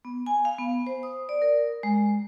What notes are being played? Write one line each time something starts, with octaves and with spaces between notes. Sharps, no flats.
B3
G#5
F5
B3
C5
D#6
D5
A#4
G#3